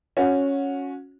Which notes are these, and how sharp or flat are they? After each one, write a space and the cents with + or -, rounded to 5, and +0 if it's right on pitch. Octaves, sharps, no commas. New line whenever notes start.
C#4 +0 F#4 -20